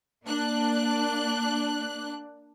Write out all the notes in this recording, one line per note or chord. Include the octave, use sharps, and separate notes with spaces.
A#3 D4 F#6